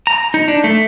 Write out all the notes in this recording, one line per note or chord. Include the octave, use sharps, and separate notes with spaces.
A#5
D#4
D4
A3